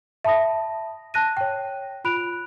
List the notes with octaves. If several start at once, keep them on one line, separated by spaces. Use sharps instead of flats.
E5 A5 B5 D#6 A#6
A5 F#6 A#6 D#7
C#5 G5
F4 B5 F#6 D7 F7